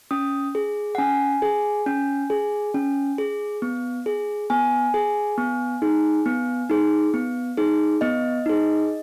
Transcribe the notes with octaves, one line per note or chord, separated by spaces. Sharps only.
C#4 D#6
G#4
F#5
C#4 G#5
G#4
C#4
G#4
C#4
G#4
B3
G#4
B3 G#5
G#4
B3
D#4 G#4
B3
D#4 G#4
B3
D#4 G#4
B3 D#5
D#4 G#4